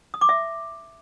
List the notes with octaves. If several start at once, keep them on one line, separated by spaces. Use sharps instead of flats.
D#6
D6
E5